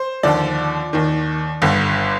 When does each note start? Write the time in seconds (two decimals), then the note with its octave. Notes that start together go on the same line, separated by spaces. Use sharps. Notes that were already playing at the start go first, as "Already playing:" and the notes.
Already playing: C5
0.23 D#2 D3 F3 D5
0.93 D#2 D#3
1.62 G1 G2 D3